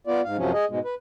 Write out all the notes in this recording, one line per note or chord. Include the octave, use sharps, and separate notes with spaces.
B3 F4 D5
G#2 F5
F#2 C3 F3 F#3 C#4
G#4 D#5
G#2 B2 G#3
B4